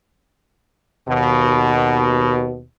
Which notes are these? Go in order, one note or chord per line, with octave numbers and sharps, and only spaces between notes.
D#2 B2